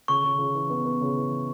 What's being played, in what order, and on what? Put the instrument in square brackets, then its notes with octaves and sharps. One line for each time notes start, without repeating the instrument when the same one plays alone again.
[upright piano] C#3 [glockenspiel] C#6
[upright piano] C#3
C#3
E3
B3
B3
C#3
E3